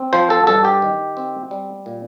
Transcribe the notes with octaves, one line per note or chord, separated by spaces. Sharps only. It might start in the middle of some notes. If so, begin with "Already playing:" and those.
Already playing: C4
F3 C5
A4
G2 A4
G4
D#3
C4
G3
A#2